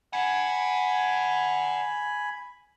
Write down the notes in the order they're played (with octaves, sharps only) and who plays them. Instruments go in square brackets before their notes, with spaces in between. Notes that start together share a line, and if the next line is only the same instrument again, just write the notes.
[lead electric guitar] D5 F#5 [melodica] G#5 B5